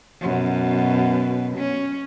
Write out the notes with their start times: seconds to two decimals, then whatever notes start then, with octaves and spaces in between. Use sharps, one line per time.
0.21 F#2 B2
1.58 C#4